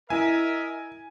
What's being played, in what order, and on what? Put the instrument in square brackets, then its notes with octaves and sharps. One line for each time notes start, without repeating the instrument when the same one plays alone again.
[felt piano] E4 [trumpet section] A#4 D#5 E5 [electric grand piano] G#5